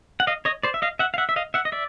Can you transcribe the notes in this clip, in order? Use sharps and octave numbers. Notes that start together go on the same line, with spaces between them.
F#5
D#5 F5
C#5 D#5
C5 D5
E5
D#5 F5
E5 F#5
F5
E5 F#5
E5
D#5 F5
E5 F#5
D#5
D5 E5